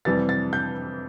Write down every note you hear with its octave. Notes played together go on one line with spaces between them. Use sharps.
F2 C3 E3 G3 A6
A6
G6